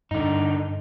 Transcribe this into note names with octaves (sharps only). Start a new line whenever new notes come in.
G2 D3 D#4